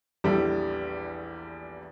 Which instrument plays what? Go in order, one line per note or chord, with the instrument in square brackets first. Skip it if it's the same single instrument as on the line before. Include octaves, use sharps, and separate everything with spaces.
[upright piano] A#1 E2 G3 E4 G4 A4